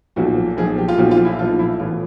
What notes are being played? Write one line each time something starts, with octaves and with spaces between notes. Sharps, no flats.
B1 A#2 F3 F#4
B1 A#2 F3 G#4
G4
F4
B1 A#2 F3 F#4
F4
E4
B1 A#2 F3 F4
E4
A1 A2 E3 F4